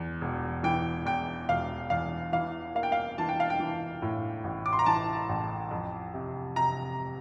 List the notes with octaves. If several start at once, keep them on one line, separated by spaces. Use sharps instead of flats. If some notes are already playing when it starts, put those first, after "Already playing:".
Already playing: E2
E1
E3 G5
E2 G5
E1 F5
E2 F5
E3 F5
A#3 F5
G5
F5
E3 A5
G5
F5
G5
E3
A2
A1
D6
C6
A#5
E3 A5
A1
F2
C3
C3 A#5